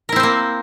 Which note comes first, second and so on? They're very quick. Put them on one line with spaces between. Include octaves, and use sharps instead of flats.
A#4 E4 C4 C5 A#3